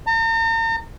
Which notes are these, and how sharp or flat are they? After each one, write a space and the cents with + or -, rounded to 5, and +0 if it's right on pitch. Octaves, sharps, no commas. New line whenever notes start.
A#5 -45